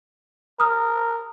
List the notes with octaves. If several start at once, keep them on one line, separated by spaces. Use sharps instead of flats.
A#4 D#6 F6